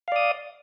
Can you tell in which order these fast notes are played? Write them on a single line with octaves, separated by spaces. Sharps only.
F5 D5 D#6